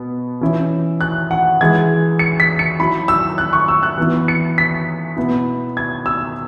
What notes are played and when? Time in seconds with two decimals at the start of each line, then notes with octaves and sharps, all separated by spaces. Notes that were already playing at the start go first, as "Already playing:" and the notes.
Already playing: B2 B3
0.41 E3 C#4 E4
1.01 F#6
1.31 F#5
1.61 E3 G#3 E4 G#6
2.19 C#7
2.40 B6
2.59 C#7
2.79 F#3 E4 B5
3.08 E6
3.38 F#6
3.53 C#6
3.68 E6
3.83 F#6
3.98 E3 B3 E4
4.28 C#7
4.58 B6
5.16 B2 B3 E4
5.77 G#6
6.06 E6